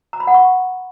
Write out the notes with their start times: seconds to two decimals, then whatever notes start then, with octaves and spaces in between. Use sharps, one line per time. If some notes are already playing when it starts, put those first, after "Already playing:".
0.13 A#5
0.20 B5
0.27 F#5
0.34 C#6